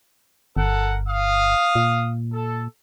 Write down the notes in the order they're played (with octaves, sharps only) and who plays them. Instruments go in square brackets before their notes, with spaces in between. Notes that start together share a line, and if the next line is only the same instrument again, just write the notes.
[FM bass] G1 [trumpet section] A4 A#4 F#5
[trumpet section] F5 D#6
[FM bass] A#2
[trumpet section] A4